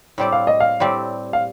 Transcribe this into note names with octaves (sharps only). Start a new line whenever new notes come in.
A2 G3 C4 G4 D5
F5
D#5
F5
A2 G3 C4 G4 D5
F5